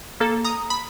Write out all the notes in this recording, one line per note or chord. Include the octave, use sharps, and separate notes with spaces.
A#3 A4
A#5 D#6
B5